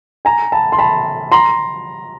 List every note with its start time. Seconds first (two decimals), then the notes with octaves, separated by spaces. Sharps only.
0.25 G#5 A#5
0.52 A5 B5
0.72 C6
0.79 A5 B5
1.32 A#5 C6